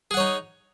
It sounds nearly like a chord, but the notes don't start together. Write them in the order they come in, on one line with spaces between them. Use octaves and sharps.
G#4 F#5 C#5 D#4